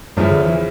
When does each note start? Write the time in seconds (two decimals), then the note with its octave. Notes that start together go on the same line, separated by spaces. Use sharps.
0.17 E2 G2 C#3 F3 C#4 E4
0.31 D3
0.45 E3